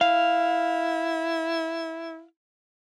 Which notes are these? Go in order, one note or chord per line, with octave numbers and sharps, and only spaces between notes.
E4 F5